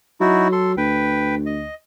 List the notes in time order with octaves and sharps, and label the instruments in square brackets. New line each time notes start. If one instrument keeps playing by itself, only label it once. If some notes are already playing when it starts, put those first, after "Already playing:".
[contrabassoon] F#3 [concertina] D#4 E4 F#4
[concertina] A4 C6
[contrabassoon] D2 [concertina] B4 G5
[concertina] D#5